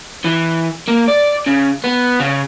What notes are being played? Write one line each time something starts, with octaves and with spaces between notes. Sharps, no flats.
E3
A#3
D5
C#3
B3
C#3